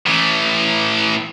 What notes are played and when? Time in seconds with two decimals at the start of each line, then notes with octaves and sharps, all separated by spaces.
0.06 A2 E3